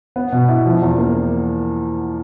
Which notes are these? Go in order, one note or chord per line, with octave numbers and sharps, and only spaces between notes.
B3
B2
E4
F3
E2
A#3